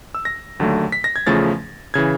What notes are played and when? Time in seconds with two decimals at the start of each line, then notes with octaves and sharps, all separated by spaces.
0.15 E6
0.25 A#6
0.60 D#2 D3 F#3 A3
0.92 B6
1.04 A#6
1.16 G#6
1.27 E2 C#3 F3 A3 A6
1.94 C#3 E3 G#6